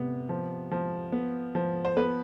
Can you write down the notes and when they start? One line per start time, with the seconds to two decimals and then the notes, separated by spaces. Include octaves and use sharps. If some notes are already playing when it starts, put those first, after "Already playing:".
Already playing: C3 B3
0.29 F3
0.71 F3
1.12 B3
1.55 F3
1.85 C5
1.97 B3 B4